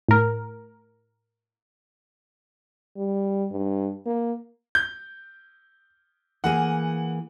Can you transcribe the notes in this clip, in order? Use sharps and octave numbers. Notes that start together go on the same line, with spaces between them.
A2 A#4
G3
G2
A#3
G6
E3 A#3 G#4 F#5